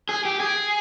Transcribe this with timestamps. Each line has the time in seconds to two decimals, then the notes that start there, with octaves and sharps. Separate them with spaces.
0.09 G#4
0.25 G4
0.40 G#4